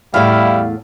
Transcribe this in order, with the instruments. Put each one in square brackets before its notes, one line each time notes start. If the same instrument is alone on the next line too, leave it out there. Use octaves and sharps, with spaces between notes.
[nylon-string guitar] E2 A2 [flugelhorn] G3 [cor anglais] E4 [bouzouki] F5